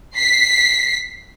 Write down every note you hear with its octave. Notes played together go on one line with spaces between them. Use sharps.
B6 C7